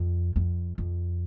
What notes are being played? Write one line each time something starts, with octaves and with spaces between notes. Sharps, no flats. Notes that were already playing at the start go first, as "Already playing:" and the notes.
Already playing: F2
F2
F2